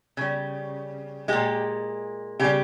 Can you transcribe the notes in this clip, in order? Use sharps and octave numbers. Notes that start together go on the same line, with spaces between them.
C#3 G3
A#2 G#3 G4
C#3 G3 G4